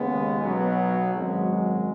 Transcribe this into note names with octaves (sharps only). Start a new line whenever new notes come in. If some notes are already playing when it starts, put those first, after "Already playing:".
Already playing: D#2 C#3 G#3 B3
B1 B2 F#3
G#1 F#2 F#3 G#3